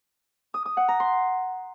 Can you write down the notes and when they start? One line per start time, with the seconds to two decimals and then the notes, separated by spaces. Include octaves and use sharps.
0.54 D#6
0.66 D#6
0.77 F#5
0.88 A#5
1.00 C6